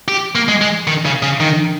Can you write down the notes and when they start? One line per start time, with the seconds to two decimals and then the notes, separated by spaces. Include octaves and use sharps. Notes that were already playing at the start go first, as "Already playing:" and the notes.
0.08 G4
0.35 A#3
0.48 G#3
0.61 G#3
0.87 D#3
1.05 C#3
1.23 C#3
1.40 D#3